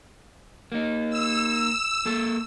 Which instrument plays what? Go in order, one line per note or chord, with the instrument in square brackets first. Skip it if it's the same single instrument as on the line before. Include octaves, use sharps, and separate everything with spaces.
[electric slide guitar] A#3 D#4
[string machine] E6
[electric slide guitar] A#3 A4